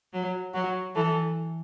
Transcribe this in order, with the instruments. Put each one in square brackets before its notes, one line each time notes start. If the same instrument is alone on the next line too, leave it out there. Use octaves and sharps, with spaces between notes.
[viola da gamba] F#3
[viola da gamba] F#3 [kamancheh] F#4
[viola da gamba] E3 [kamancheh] A4